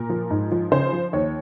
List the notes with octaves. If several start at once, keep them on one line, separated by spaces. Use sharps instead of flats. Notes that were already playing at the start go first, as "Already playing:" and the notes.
Already playing: A#2 A#4
F3
G#2
F3
C#3 C5
F3
D#2 C#5